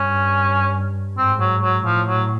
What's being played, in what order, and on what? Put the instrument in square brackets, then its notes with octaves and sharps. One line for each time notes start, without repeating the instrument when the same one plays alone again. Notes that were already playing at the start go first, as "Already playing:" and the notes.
Already playing: [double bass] G2 [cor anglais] C#4
[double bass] G#2 [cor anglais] C4
[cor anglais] F#3
F#3
[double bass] A2 [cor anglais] F3
[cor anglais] F#3